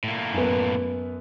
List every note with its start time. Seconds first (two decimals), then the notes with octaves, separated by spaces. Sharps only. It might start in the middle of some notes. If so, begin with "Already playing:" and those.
0.04 A2 A#3
0.34 F#2 B3